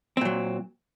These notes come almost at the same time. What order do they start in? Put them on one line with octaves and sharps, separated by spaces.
C4 A#2 F#3